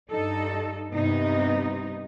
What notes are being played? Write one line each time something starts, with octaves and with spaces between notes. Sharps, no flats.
G2 D#4 A4
G2 C3 B3 D#4